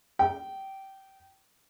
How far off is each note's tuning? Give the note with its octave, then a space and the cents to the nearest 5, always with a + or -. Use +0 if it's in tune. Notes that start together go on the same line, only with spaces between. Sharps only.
G5 -20